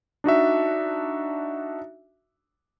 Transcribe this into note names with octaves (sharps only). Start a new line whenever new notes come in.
D4 D#4 F#4 E5